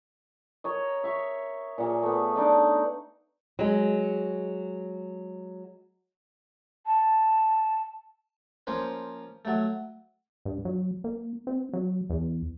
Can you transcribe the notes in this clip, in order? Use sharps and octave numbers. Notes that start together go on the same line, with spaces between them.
A#4 C#5 D#5
E5 C#6
A#2 A#3 G#4
A3 B3
D4 D#4 D5 D#5
F#3 G#3
A5
F3 A#3 C#4 C5
F#3 A3
G2
F#3
A#3
C4
F#3
E2